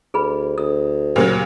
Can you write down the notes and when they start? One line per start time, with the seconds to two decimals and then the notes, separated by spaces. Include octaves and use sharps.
0.14 D2 G#4 B4 B5
0.58 D2 D#6
1.16 A#2 C#3 F#3 G4 G#4 C5